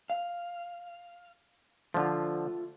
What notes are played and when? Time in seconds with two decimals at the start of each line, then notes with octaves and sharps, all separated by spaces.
0.10 F5
1.94 D3 F3 A3 F4